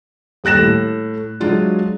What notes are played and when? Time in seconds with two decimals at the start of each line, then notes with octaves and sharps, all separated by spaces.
0.44 D#1 G4 F#6 A#6 E7
0.59 A2
1.40 F#3 G#3 D4 F4 F#4